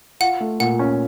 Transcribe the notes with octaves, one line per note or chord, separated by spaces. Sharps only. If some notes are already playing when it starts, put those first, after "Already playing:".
F4 F#5
A3
A#2 F#5
C#4